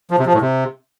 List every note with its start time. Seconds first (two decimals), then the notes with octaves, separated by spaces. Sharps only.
0.11 F3
0.18 C3
0.26 F3
0.33 A2
0.41 C3